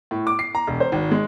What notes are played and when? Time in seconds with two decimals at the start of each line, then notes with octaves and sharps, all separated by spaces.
0.11 A2
0.27 D6
0.39 C7
0.55 A#5
0.67 E1
0.80 C5
0.92 G#1
1.11 G#3